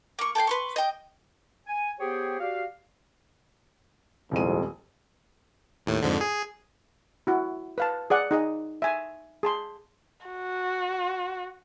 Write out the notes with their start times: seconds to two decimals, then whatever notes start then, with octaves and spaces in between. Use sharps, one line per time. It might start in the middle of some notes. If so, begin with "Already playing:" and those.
0.19 A#3 C#6
0.35 A4 G5 G#5 C6
0.47 B4 C6 C#6
0.76 D#5 G5
1.66 G#5
2.00 B3 G4 G#4 C5 C#5 G5
2.39 F#4 G4 D5 F5
4.31 D#1 C2 F2 G#3 D#7
5.86 D#2 A2
6.02 F2 G#2 D3
6.21 G#4
7.27 E4 F#4
7.78 B4 F5 A5
8.10 G#4 D5 F#5
8.31 D#4 G#4 D#5
8.82 E5 G#5
9.43 G#4 A5 C6
10.27 F#4